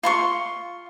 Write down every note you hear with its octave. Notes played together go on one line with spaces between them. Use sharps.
F4 C6 C#6